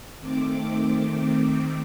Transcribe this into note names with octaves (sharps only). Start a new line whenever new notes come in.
D#3 A3 C4 D6